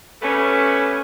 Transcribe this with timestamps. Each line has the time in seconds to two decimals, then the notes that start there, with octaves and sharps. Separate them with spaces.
0.22 G3 A3 B3 C#4